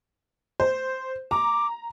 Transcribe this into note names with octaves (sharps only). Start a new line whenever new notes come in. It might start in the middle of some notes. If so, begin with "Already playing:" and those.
C5
A#5 D6